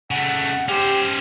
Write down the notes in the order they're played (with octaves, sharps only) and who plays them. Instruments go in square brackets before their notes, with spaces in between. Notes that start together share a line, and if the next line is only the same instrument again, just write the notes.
[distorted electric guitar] C#3 A3 [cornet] F#5
[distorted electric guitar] C#4 C5 [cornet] G4